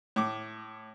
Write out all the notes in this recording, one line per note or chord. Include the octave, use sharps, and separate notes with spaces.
A2 D6